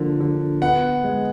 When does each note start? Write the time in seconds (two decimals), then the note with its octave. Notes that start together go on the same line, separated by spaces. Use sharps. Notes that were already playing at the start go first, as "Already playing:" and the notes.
Already playing: D3 F3 A#3
0.20 D3
0.62 B3 F#5
1.04 G#3